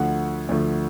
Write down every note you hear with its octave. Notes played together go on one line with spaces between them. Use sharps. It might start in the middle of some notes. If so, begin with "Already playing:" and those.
Already playing: D2 D3 F3 A3 F#5
D2 D3 F3 A3